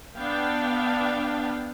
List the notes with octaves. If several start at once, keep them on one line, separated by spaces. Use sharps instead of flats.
B3 D4 F5 G5